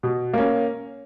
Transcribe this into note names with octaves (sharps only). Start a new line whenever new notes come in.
B2
A#3 C#4